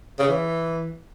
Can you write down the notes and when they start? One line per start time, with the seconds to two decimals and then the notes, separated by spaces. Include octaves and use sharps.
0.19 C#3
0.29 E3